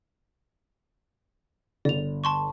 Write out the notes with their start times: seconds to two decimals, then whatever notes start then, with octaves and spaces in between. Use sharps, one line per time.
1.85 G1 D5 F7
2.24 A5 C6 C#6